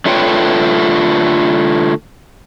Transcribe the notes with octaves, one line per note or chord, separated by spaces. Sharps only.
D3 A3 F4 B4 C#5 G5